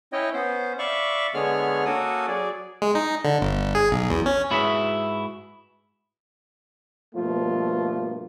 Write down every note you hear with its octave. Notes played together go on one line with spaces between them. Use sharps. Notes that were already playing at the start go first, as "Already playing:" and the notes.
C#4 E4 C#5 D#5 G5
B3 C#4 C5
D5 E5 F5 B5 C#6
D3 G#3 B3 G#4 C#5 F6
A#3 C#4 F#4 A4 A#4 D#6
F#3 G#4 D5
G#3
D#4
D3
G1
G#4
B1
E2
C#4
G#2 E4 F#4 G#4 B4 E5
G2 B2 F3 A3 A#3 F4